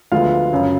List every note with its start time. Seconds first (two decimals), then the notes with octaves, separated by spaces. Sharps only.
0.12 D2 D3 F3 G#3 B3 F4 F5
0.51 F#2 C#3 F#3